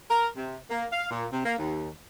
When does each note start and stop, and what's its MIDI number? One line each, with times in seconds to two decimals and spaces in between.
0.10 0.27 70
0.37 0.57 48
0.70 0.86 58
0.92 1.09 77
1.11 1.27 46
1.32 1.44 48
1.45 1.55 58
1.59 1.89 39